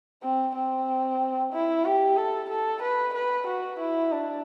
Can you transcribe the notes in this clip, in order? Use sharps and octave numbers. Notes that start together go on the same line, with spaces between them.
C4
C4
E4
G4
A4
A4
B4
B4
F#4
E4
D4